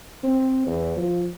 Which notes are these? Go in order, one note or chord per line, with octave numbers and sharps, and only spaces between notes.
C4
E2
F3